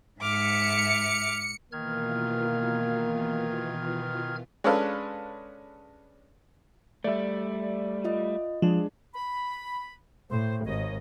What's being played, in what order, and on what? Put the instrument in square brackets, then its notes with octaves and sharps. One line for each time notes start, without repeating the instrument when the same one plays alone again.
[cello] G#2 E5 [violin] D6 F6 [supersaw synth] C#7
[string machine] B2 E3 F4 [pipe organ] D#3 F6 G#6 [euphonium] A#3
[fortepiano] G#3 C#4 D4 A4 B4 F5
[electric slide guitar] G3 A3 [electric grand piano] D5 E5
[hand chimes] F4 D#5
[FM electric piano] F3 [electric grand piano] G#3 D4 G#4
[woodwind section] B5
[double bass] A2 [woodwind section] C5
[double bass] G#1 [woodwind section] D#2 C#5 D#5